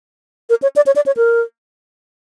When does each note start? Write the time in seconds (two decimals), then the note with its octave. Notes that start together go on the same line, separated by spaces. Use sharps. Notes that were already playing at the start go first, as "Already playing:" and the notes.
0.50 A#4
0.62 C#5
0.76 D5
0.86 C#5
0.96 D5
1.06 C#5
1.17 A#4